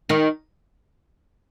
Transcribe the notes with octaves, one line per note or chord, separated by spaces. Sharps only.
D#3 D#4